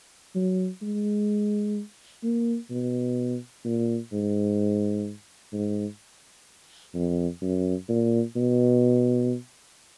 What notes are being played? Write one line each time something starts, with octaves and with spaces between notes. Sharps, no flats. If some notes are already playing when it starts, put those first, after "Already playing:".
F#3
G#3
A#3
B2
A#2
G#2
G#2
F2
F#2
A#2
B2